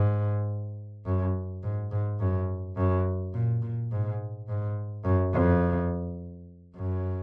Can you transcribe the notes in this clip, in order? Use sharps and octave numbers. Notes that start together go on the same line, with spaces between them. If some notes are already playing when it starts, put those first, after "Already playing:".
Already playing: G#2
F#2
G#2
G#2
F#2
F#2
A#2
A#2
G#2
G#2
F#2
F2
F#2